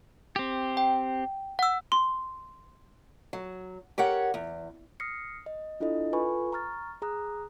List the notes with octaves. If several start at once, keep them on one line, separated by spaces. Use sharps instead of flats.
C4 G4
G5
F#5 E6
C6
F#3
G4 A#4 C#5 F#5
E2
D#6 F6 A#6 C7 C#7
D#5
D4 E4 F4 A4 D#5
F4 A4 B4 G#5 B5 C#6
A#5 C#6 F6 A6
G#4 A#5 D#6 F#6